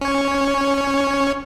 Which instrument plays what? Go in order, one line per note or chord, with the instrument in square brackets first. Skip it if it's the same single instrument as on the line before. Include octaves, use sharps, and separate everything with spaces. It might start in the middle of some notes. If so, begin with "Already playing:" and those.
[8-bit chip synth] C#4 C#5